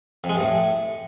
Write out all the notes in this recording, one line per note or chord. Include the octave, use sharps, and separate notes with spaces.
F2
G#3
G2
A2